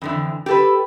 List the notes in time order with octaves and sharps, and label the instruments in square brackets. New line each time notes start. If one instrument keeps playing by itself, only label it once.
[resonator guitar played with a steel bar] F2 D3 E3
G4 A4 B4